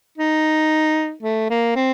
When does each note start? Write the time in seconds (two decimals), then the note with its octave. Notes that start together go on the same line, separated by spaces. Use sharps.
0.18 D#4
1.23 A3
1.50 A#3
1.76 C4